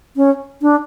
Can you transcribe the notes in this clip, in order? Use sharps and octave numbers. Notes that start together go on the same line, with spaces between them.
C#4
D4